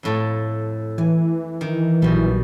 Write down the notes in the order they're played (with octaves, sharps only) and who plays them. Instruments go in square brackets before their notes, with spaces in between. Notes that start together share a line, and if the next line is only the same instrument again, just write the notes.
[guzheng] F2 A2 A4
[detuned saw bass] E3 [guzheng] G#5
[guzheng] D#3
[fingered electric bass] A#1 F#3 [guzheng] B2 G3